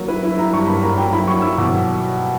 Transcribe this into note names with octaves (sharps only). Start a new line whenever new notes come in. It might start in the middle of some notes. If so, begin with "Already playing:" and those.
Already playing: F#3 A#3
E4 B4
E4
E4 A#5
G2 C#6
A#3 B5
A#3 A#5
F#3 G5
E4 B5
F#3 C#6
E4 E6
B2 D6